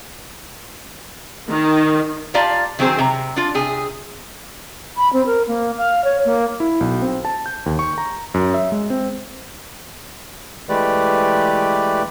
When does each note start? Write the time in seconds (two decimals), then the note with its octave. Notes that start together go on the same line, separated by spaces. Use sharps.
1.50 D#3
2.34 F4 G4 D5 F5 A5 A#5
2.79 D#3 F#3 B3 C4 G#4 C5
2.99 C3 A#5
3.36 D4 F4
3.55 C3 G#4
4.97 B5
5.13 C4
5.26 A#4
5.48 A#3
5.78 F5
6.04 C#5
6.25 A#3
6.60 E4
6.81 B1
7.02 C4
7.25 A5
7.46 G6
7.66 D#2
7.79 C#6
7.98 A#5
8.34 F#2
8.54 E5
8.72 G#3
8.90 C4
10.69 E3 G#3 A3 G4 B4 D5